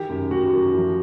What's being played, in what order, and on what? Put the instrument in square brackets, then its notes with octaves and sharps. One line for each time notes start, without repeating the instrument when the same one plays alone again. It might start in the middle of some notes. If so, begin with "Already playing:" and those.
Already playing: [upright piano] D#3 [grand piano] G4
[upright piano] F#2
[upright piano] F#2 [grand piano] F#4
[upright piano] F#2
F3